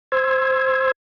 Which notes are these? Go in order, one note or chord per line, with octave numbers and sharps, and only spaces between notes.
C5 C6 E6 G#6